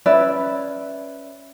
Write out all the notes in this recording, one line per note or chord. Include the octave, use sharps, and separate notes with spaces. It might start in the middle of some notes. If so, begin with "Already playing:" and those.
C#4 B4 D5 E5